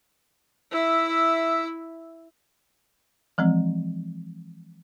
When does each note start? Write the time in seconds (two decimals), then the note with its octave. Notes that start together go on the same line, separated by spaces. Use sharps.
0.71 E4 E5
3.38 E3 F3 G#3 C4